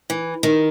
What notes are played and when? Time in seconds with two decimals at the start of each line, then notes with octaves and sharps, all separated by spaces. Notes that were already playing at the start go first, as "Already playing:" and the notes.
0.10 E3
0.43 D#3